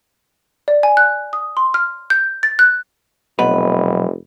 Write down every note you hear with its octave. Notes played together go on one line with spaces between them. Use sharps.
D5
G#5
F#6
D#6
C6
F6
G6
A6
F#6
F1 B1 B2 B4 D#5 F#5 B5